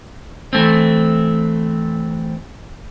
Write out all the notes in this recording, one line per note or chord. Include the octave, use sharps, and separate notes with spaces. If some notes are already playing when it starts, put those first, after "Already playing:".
E3 A3 C4